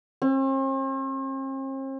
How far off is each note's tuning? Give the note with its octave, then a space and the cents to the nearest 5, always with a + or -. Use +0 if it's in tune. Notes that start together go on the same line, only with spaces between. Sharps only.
C4 +45